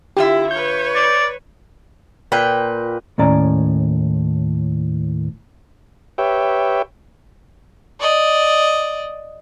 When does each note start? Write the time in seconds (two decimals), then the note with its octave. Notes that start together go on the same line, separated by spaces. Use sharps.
0.17 D3 E4 F4 G4 E5
0.51 B4 C#5 G6
0.95 D5
2.32 A#2 B4 G5
3.18 D#2 A2 C#4 D5 A#5
6.18 G4 B4 C#5 E5 G5
8.00 D5 D#5